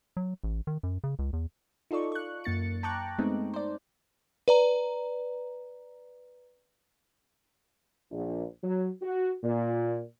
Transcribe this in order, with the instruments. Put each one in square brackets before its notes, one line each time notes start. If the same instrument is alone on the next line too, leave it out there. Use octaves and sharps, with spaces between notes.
[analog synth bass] F#3
A1
D#3
F#2
C#3
C#2
E2
[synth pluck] D#4 F4 A4 D5 C#6
C#6 F#6
F#2 A#3 A6 C#7
G5 A5 A#5 C#6 D6 F#6
G#3 A3 B3 C4 D#4
C5 D5
[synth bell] B4 D5 A#5
[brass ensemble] A#1
F#3
F#4
A#2